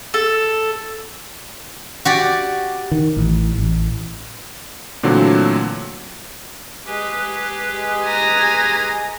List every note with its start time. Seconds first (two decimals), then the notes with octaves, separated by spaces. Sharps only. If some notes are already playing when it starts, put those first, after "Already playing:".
0.14 A4
2.05 F#4 G4 D5
2.92 D#3
3.17 A1
3.58 A1
5.03 A#2 D3 E3 F#3 A3 C4
6.86 G#3 G4 G#4 B4
8.03 G#5 A#5